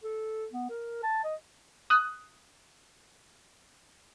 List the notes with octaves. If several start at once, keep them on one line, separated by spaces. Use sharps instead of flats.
A4
B3
A#4
A5
D#5
D#6 F#6